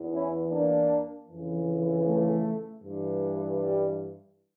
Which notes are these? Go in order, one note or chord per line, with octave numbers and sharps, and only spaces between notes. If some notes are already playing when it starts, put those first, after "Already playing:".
Already playing: E2 E3
C#4 E4
A#3 D4
F2 C#3 E3
A3
G2 E3
G3